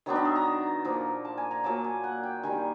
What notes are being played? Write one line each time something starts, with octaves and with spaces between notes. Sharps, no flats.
D#3 F#3 B3 D4
D#5
E5
A#5
A#2 F3 A#3
A5
G#5
A#5
A#2 F#3 A#3 A5
G#5
F#5
G5
D#3 G3 A#3 G#5